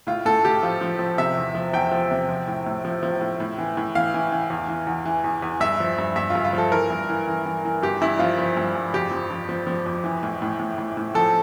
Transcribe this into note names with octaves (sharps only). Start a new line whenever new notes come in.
A2 F4
A2 A4
A2 G4
F3 F4
F3
F3
C3 E5
E2
F3
E2 G5
F3
C3
F3
A2
A2
F3
F3
A2
A2
E3
A2
E3 F5
E3
E3
E2
E3
E2
E3
E2
E2
G2 E5
F3
G2
G2 E5
F4
G2
F4
F3 A4
E3 A#4
G2
E3
E3
E3
E3
G2 G4
G2 E4
F3 F4
F3
G2
G2
F2 G4
F3
F3
F3
F3
F2
E3
A2
A2
A2
A2
A2
F3 A4